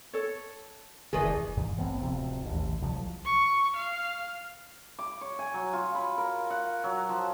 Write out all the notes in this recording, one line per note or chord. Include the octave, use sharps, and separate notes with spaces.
A4 C#5
F#1 C#2 D#3 E3 D4 G#4
G2 E3
A1 B3 C4
D1 C3 F3 C4
A1 D#2
C2 F3 F#3
C#6
F5
D6
C#5
G#5
F#3
F4
B5
A#4
F#5
F#3
F3